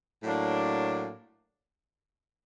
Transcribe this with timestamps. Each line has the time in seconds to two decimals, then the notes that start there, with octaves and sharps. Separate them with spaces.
0.23 A2 F#3 A#3 D4